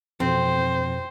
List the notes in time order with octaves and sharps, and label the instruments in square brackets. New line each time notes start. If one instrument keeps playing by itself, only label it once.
[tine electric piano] F2 B2 [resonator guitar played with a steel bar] C4 [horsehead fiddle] C5